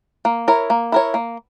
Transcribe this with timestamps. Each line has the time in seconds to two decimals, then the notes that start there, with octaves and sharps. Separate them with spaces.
0.25 A#3
0.48 E4 A#4 C#5
0.70 A#3
0.92 E4 A#4 C#5
1.14 A#3